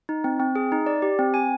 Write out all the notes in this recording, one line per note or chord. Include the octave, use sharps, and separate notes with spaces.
D#4
C4
C4
G#4
D#4
D5
G4
C4
G#5